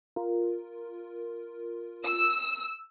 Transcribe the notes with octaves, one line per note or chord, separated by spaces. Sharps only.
F4 A#4
E6